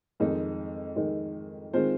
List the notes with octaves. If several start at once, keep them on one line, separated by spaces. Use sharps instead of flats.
F2 D#3 G#3 D#4
F2 D#3 G#3 D#4
D#3 G#3 C4 F4 C5